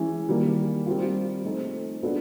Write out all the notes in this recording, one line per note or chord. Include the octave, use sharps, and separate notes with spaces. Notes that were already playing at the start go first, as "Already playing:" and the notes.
Already playing: E3 G#3 C#4
D#3 G3 A#3
G3 C4 F4
A3 C4 D#4 G#4
G#3 B3 D4 F4 A4